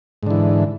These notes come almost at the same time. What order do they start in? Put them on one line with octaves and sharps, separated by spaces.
G#2 D3 E3